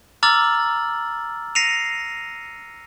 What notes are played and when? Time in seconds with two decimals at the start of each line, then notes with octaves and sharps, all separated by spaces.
0.23 A#5 D6 E6 F6 A6 F#7
1.55 A#6 C7 C#7 D#7 F7